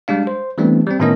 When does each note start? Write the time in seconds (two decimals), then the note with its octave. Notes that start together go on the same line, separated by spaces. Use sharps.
0.08 G3 G#3 D4 F5
0.27 C5
0.58 E3 G3 A3 B3 C4 D4
0.87 G3 C4
1.00 A2 D#3 B3 C#4 A#4 D#5